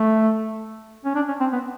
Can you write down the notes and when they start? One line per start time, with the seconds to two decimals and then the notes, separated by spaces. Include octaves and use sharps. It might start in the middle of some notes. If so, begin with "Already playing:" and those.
Already playing: A3
1.05 C#4
1.15 D4
1.28 C#4
1.40 C4
1.53 B3